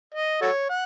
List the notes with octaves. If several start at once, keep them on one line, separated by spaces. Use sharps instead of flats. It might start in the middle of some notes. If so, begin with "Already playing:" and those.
D#5
F#4 A4 C#5
F#5